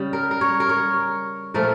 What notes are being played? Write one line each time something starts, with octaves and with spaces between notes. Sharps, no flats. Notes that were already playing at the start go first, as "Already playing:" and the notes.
Already playing: C#3 G3
A#4
A#4
C#5
A#4
C#5
A#2 F3 A3 A#4